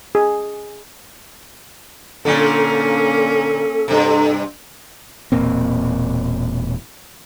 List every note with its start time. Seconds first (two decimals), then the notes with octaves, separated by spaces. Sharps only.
0.15 G#4
2.25 A#2 D3 A#3 C#4 A4
3.88 G2 C3
5.32 E1 A#2 A#3 C4